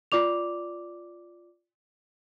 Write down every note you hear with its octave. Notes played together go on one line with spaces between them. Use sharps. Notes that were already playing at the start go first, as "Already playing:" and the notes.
F4 D5 D6 F7